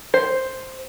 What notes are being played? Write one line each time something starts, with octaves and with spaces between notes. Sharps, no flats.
C5